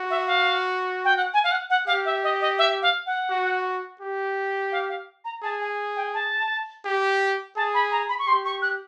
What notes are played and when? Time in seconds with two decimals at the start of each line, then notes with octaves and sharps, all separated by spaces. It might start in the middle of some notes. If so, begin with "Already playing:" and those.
Already playing: F#4
0.10 E5
0.27 F5
1.05 G5
1.17 F#5
1.34 G#5
1.44 F5
1.51 F#5
1.70 F#5
1.87 G4 F5
2.05 E5
2.24 D#5
2.41 D#5
2.58 E5
2.82 F5
3.06 F#5
3.30 F#4
4.01 G4
4.72 F5
4.89 F5
5.25 A#5
5.43 G#4 A5
5.61 G#5
5.96 G5
6.14 A5
6.85 G4
7.56 G#4 A5
7.74 B5
7.92 A#5
8.09 B5
8.19 C#6
8.27 G4 C6
8.45 C#6
8.62 F#6